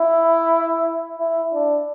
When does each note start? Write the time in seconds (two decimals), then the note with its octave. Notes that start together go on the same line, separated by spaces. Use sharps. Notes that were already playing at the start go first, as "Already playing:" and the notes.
Already playing: E4
1.19 E4
1.53 D4